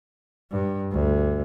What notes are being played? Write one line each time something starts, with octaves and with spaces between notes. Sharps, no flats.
G2
D2